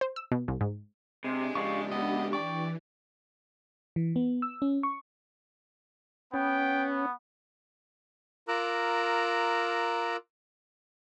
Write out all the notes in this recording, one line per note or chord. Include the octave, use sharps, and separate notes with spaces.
C5
E6
B2
C2
G#2
C3 G#3 D4 G4
G#2 C#3 D5 F5 C#6
B3 D#5
E3 D5 G5 C#6
E3
B3
E6
C#4
C#6
B3 C#4 G5
F4 A#4 A#5 D6 E6 F#6